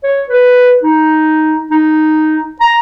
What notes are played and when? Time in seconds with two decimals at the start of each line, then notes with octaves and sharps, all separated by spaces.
0.03 C#5
0.29 B4
0.83 D#4
1.71 D#4
2.61 A#5